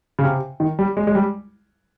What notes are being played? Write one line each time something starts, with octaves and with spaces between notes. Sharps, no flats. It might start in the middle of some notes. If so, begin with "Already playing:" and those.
C#3
C3
D#3
G3
G#3
G#3
G3